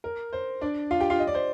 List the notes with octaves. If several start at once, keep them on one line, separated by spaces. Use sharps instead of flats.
A#4
C5
D4 D5
F4 F5
G4 G5
F4 F5
D#5
D5
C5